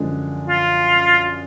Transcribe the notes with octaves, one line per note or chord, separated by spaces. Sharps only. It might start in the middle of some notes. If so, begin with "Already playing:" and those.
Already playing: F#2 D3 F3 G#3
F4